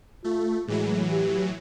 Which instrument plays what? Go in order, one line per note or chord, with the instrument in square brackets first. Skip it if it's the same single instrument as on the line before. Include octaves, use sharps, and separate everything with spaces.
[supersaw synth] A3 [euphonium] F4
[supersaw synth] A2 E3 F#3 [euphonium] G#3
[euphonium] G4